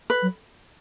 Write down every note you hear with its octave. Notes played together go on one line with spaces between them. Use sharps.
B4
F#3